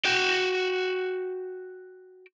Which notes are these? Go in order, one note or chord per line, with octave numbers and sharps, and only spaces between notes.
F#4 G5